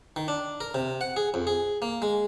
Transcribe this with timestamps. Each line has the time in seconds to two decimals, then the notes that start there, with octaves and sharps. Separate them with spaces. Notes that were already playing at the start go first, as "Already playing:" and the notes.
0.16 D#3
0.28 D4
0.61 A#4
0.74 C3
1.01 F#5
1.17 G#4
1.34 F2
1.47 G#4
1.82 A#3
2.02 G#3